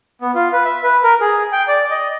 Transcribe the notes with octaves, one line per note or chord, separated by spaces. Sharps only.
B3
F4
B4
E5
B4
A#4
G#4
G5
D5
D#5